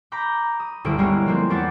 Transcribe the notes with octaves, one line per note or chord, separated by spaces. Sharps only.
A#5 B5 D6 G6
D#6
G1 D2 E4 D7
G3 G#3 A#3 B3 C#4 E4
F3 A#3 C4
E2 D4 B4 F#5 D6 A6